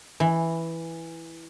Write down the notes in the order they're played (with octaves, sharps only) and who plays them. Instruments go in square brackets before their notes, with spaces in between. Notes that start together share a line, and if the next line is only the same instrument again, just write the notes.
[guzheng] E3